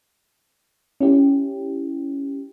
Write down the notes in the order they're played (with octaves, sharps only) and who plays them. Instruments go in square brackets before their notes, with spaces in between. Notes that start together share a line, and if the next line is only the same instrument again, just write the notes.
[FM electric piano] C#4 E4 G4